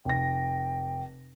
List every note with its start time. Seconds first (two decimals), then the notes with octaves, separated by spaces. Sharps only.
0.05 F1 G5 A#6